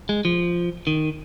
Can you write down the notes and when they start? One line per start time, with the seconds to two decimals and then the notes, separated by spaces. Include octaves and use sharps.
0.09 G#3
0.25 F3
0.87 D#3